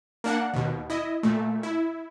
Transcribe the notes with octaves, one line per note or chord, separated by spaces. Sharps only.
A#3 D4 F#5
D#2 B2
E4 D#5
A#2 A3
E4